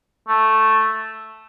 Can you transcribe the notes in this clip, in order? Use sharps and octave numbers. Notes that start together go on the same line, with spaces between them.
A3